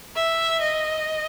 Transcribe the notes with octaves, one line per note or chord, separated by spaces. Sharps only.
E5
D#5